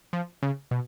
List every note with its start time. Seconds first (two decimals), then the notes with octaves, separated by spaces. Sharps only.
0.13 F3
0.43 C#3
0.71 B2